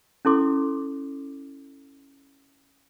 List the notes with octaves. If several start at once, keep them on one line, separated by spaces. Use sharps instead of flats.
C#4 E4 A4 C6 D6